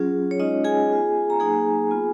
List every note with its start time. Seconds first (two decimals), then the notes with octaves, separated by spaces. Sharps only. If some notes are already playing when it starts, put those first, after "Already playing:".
Already playing: F#3 C#4 F4 G#4
0.31 C#5
0.39 G#3 C#4 D#4 F4 D#5
0.64 G#4 G#5
0.90 B3 F4
1.30 A#5
1.40 F#3 A#3 D#4 G#4 G#5
1.91 B3 F4